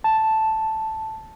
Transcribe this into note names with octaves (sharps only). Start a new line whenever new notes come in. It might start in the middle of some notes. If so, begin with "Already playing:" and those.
A5